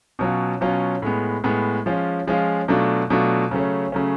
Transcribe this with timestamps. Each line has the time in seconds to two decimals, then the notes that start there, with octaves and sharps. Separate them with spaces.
0.19 B2 F#3 C#4 F4
0.61 B2 F#3 C#4 F4
1.02 A2 G#3 B3
1.44 A2 G#3 B3
1.86 F3 G#3 C#4 F4
2.27 F3 G#3 C#4 F4
2.68 B2 F#3 A3 D4 F4
3.10 B2 F#3 A3 D4 F4
3.51 C#3 F#3 A3 C#4
3.92 C#3 F#3 A3 C#4